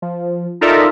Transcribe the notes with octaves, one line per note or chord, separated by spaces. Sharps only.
F3
D#4 F4 A4 A#4 D5 E5